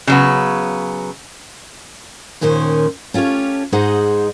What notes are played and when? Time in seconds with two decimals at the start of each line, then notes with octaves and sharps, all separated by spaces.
0.07 C#3 F#3 B3
2.41 D#2 A#2 D#3 C#4 C5
3.14 C#4 F4 G4 A4 C#5
3.72 G#2 D#4 G#4 C5 D#5 F#5